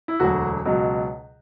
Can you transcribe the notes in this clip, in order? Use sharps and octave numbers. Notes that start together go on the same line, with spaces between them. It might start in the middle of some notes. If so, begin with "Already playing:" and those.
E4
E1 D2 D3 F#3 F#4
C#2 B2 F#3